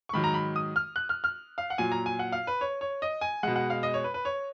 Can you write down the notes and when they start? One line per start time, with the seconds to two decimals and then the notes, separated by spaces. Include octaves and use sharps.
0.09 C#6
0.13 G#2 D#3 F#3 B5
0.24 A#5
0.34 B5
0.56 D#6
0.76 F6
0.96 F#6
1.09 F6
1.24 F6
1.58 F5
1.70 F#5
1.78 A#2 F#3 G#5
1.92 A#5
2.06 G#5
2.19 F#5
2.32 F5
2.47 B4
2.61 C#5
2.81 C#5
3.02 D#5
3.21 G#5
3.43 G#3 F#5
3.47 B2
3.56 F#5
3.70 F5
3.83 D#5
3.94 C#5
4.04 B4
4.14 B4
4.25 C#5